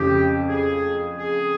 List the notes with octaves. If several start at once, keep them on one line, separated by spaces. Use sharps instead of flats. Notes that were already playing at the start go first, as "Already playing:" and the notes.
Already playing: F2 C#3 F3 G4
G#4
G#4